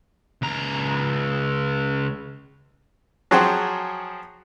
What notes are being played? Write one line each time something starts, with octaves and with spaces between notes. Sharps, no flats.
C#2 A#5
F3 F#3 F#4 G#4 C5 G5